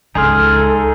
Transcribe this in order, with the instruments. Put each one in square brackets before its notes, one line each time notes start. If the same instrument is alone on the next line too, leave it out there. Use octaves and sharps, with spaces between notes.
[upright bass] C#2 G#3 [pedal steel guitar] D#4 G#4 F6 [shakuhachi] A4 [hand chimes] G#5 C6